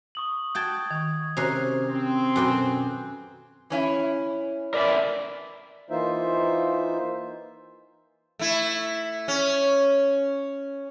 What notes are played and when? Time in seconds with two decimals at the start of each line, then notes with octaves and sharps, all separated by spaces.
0.15 C#6 D#6 F#7
0.55 F#4 G5 A5 G6 G#6
0.91 D#3 C#6 G#6
1.37 C3 C#4 F#4 A#4 C5 F#6 C7 F7
1.87 C4
2.36 F#2 B2 F#4 A4 G5 G#5 D6 F#6
3.70 E3 C#4 E4
4.74 A#4 B4 D5 E5
5.90 E3 A#3 D#4 F4 C5 E5
8.39 A3 E4
9.28 C#4